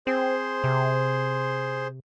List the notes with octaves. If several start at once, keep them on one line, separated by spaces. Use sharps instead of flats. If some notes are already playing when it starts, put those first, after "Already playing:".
C4 G#4 C5 C6
C3